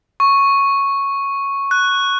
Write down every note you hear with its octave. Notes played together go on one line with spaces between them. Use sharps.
C#6
F#6